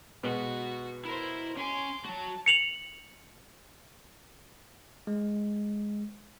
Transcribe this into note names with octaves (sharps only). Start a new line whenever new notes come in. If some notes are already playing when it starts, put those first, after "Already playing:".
B2 G#3 F#4 B4
E4 A#4 C5
C#4 G#5 C6 D6
F#3 F#4 A5
C#7 F7 F#7
G#3